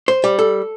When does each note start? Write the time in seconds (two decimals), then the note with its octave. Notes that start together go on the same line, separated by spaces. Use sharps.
0.08 C5
0.24 G3
0.39 A4